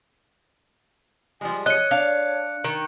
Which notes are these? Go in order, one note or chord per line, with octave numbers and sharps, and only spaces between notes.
F3 G3 G#3 G#5
C#5 D#5 F#6 C#7
D4 F5
D#3